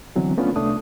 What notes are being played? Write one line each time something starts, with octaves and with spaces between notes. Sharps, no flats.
D3 E3 F#3 B3 C4
A3 B3 C#4 D4 F4
C2 A3 D4 D#6